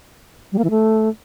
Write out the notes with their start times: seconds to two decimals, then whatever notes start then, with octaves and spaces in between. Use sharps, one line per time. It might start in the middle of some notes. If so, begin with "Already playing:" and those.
0.52 G3
0.58 A#3
0.64 E3
0.70 A3